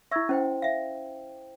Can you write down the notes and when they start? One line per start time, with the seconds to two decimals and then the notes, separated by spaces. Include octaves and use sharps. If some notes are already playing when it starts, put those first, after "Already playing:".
0.11 E4 E5 C#6 E6 G#6
0.29 C#4 E4 C5 G5
0.62 E5 F5